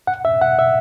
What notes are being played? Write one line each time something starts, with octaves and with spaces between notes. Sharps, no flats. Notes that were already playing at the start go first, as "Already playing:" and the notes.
F#5
E5
F#5
E5